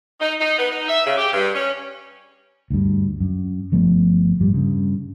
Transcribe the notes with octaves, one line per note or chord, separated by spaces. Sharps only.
D#4
D#4
B3
D#4
E5
C#3
G4
G2
C#4
D2 G2
F#2
G1 F3 A3 B3
A1 G2 F3 G3
G2 C#3